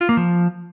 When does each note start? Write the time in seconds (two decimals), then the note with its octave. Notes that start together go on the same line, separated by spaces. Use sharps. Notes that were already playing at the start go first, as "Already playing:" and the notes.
0.01 F4
0.09 A#3
0.17 F3